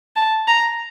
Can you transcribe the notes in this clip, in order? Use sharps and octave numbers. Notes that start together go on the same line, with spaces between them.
A5
A#5